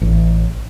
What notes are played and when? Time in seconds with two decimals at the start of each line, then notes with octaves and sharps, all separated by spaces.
0.02 A1